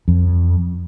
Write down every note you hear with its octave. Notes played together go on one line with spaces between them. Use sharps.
F2